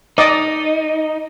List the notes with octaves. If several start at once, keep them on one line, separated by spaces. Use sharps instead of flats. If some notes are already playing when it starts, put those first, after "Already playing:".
D#4 D5 D#5 D#6